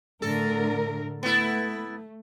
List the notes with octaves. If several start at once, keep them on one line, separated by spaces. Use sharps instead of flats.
A2 D3 A4 A#4
A3 B3 E4